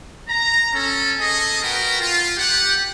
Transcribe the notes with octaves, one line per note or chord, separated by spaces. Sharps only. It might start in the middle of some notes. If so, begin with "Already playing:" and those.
A#5
C#4 A4
G#4 A4 D#5
F#4 A#4 B4 G5
F4
G4 F#5